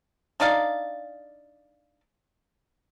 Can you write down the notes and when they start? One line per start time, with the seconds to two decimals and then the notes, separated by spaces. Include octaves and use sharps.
0.40 D4 D#4 D5 F5